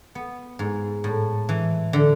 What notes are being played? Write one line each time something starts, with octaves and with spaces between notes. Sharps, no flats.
B3
G#2
A2
E3
D3